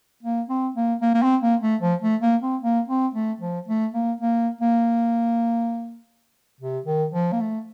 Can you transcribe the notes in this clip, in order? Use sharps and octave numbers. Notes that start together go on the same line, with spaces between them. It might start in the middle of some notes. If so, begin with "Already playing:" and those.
A#3
C4
A#3
A#3
A#3
C4
A#3
A3
F3
A3
A#3
C4
A#3
C4
A3
F3
A3
A#3
A#3
A#3
C3
D#3
F3
A#3
A3